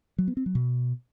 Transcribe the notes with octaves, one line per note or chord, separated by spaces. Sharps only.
F#3
B3
C4
F#3
B2